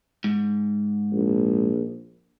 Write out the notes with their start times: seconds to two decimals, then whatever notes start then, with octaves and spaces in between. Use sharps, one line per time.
0.24 G#2
1.12 A#1